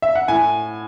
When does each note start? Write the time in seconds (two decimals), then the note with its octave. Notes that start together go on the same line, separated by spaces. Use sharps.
0.02 E5
0.15 F#5
0.28 A2 G#5